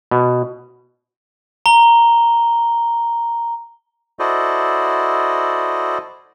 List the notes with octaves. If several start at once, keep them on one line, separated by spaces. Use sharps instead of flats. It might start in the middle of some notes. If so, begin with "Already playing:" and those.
B2
A#5 G7
E4 F#4 A4 C5 D5 D#5